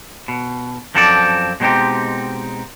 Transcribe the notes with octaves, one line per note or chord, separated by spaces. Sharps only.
B2
F#2 F3 C4 A4 A#4 D5
B2 G#3 C4 D#4 G4